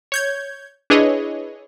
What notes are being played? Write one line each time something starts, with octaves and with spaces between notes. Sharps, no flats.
C#5 G6 G#6
D4 E4 G#4 B4 C#5 D#5